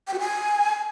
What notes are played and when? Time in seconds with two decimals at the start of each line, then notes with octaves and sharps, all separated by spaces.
0.07 G5
0.13 F#4
0.19 G#5